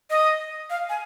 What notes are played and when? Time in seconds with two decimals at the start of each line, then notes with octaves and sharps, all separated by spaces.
0.10 D#5
0.70 F5
0.89 G#5